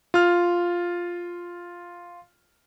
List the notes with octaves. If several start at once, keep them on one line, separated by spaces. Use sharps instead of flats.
F4 F6